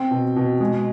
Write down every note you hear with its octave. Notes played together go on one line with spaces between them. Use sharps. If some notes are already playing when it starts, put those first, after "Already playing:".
Already playing: C4 G5
B2
B2
G#3